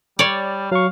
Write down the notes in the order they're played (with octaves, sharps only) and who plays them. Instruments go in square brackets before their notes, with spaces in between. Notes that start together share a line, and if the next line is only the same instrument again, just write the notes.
[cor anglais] G3 [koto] C#5 D5
[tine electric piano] F#3 C#6 [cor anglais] F5